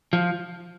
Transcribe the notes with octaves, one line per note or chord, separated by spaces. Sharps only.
F3